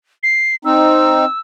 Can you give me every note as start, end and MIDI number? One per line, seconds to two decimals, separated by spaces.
0.23 0.56 96
0.65 1.25 60
0.65 1.25 63
0.65 1.39 88